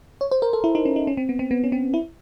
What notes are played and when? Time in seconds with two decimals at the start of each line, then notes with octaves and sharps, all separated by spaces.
0.21 C#5
0.31 C5
0.42 A#4
0.53 A4
0.64 E4
0.75 D#4
0.85 C#4
0.96 D#4
1.07 C#4
1.17 C4
1.29 B3
1.39 C4
1.51 B3
1.64 C#4
1.72 C4
1.94 E4